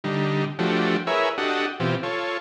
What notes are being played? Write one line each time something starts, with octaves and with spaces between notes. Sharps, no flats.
D3 G3 D#4
F3 A3 D4 F#4 G4
E4 G#4 A#4 B4 C#5 E5
D4 F#4 G4 A4 D#5 F#5
B2 E3 C4 F4 G4
F4 A4 C#5